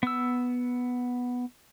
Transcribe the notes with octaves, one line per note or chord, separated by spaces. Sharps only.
B3 E6